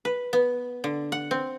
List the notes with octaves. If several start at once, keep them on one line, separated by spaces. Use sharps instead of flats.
B4
B3
D3
F#5
C4